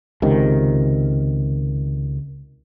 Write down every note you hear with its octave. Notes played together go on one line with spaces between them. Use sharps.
C#2 C3 D#3